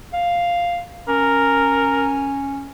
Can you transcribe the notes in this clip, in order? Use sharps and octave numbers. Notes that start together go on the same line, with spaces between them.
F5
C#4 A#4